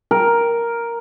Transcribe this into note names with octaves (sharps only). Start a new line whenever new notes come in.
A#4